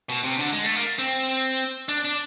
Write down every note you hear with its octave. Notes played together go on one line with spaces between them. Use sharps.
B2
C3
D3
G#3
A3
A#3
C4
D4
D4